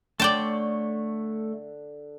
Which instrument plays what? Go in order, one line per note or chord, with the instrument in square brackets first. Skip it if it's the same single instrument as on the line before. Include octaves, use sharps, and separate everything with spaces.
[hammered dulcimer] D3 [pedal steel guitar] A3 C#5 C6 [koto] D5 G5 A5